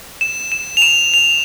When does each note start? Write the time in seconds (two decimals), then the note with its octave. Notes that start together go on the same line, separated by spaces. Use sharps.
0.21 E7
0.52 E7
0.77 F7
0.82 E7
1.14 F7